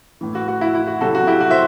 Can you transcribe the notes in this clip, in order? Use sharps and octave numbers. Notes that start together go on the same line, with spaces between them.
A2 E3
F#4
F#4
E4
E4
F#4
C3 F#3 F#4 A4
F#4
E4 G4
F#4
C5 E5